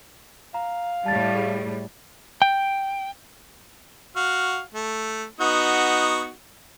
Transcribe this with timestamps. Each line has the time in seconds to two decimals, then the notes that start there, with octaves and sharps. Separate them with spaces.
0.54 F5 A#5
1.06 A2 G3 A5 A6
1.35 G#4
2.42 G5
4.16 F#4 F5
4.75 A3
5.40 B3 D#4 F#4